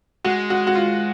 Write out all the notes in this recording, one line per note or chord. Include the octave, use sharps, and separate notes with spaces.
G#3 F#4
F#4
F#4
F4